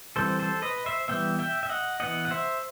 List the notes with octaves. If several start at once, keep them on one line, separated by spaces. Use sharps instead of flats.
E3 G3 C4 A4 C5
A4 C5
B4 D#5
C5 E5
E3 G3 B3 E5 G5
E5 G5
E5
D#5 F#5
E3 B3 D#5 F#5
F#5
C5 E5